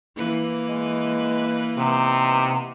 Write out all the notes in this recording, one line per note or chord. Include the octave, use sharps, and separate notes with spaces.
E3 A#3 B4
G#3
C3 B3 D#4